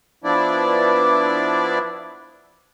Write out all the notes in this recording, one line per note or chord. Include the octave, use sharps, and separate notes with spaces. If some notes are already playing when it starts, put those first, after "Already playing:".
F3 B3 D4 E4 D5